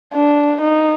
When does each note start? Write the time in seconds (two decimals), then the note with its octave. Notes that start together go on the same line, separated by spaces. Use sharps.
0.13 D4
0.61 D#4